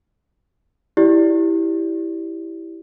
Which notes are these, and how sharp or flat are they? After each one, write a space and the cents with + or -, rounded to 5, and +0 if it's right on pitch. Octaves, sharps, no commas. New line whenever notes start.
E4 +0 G4 -5 D5 +0